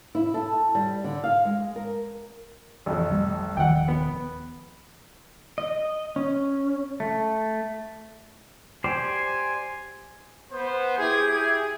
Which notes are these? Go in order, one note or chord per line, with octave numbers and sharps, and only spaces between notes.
E4
A4
G3
D3
F5
G#3
A#4
A1 F2
F3 G3 A3
D#1 D#3 F3 F#5 G5
B3
D#5
C#4
A3
G4 C5 D5 G#5
B3 C5
E4 G4 G#4 G#6
G#4